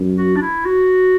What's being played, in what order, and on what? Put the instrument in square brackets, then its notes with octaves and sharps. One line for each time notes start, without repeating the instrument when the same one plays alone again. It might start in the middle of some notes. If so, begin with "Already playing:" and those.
Already playing: [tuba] F#2
[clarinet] F#4
D4
E4
F#4